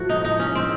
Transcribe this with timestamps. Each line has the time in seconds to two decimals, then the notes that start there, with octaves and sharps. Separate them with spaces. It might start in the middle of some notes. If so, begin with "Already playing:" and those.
Already playing: A2 F3 F#4
0.09 D#4
0.24 D#4
0.40 C#4
0.55 C4